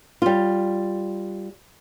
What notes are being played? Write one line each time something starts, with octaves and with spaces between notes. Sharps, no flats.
G3 F4